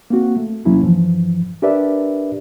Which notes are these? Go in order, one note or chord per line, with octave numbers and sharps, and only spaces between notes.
A#3 C4 F#4
A3
E2 C3 F#3 A#3 C#4 E4
G2 E3 F3
D4 G4 A#4 B4 D5 E5